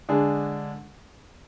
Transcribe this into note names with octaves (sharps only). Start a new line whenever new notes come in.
D3 G#3 D4 G#4